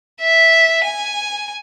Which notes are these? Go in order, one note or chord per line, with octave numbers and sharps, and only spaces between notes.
E5
G#5